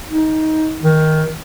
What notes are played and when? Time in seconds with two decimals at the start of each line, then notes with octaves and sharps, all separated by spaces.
0.08 D#4
0.82 D#3